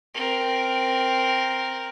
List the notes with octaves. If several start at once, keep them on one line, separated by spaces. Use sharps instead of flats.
C4 A#4